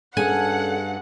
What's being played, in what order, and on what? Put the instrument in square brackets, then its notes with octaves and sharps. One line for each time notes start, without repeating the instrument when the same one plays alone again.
[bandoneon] G2 [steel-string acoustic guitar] C#4 G#4 A4 [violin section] F#5 [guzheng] G#5